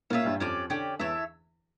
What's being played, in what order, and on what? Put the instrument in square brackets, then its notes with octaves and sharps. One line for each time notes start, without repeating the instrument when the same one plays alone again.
[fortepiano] A#2 A#3 [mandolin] C#4 F4 C#5 E5
[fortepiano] G2 G3
[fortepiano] F2 F3 [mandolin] C#4 G4 D5
[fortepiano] D3 [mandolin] C#4 G4 D5
[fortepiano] E2 E3 [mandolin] E4 A4 C#5 E5